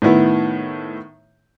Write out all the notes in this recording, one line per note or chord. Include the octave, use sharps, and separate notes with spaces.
A2 D#3 B3 E4